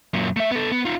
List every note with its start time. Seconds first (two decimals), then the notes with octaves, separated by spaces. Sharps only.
0.14 F#2 A#2
0.37 A3 E5
0.51 B3 A4
0.72 B3
0.85 D#4 F4